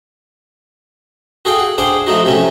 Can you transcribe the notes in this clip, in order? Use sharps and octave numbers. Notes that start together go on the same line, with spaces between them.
F#4 G#4 A4 F5 G5
F#5
D4 G#4 C5 F5 G5 C6
F3 A3 D#4 F#4
C3 F#3 A3 C#4